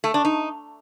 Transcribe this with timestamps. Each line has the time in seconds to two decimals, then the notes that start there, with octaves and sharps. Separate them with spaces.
0.04 A3
0.14 D4
0.25 D#4